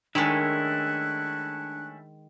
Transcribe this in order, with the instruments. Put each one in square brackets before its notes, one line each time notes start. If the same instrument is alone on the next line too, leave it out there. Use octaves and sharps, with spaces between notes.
[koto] D#3 G#3 [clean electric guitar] A3 C#4 E4 [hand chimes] D4 [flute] F#6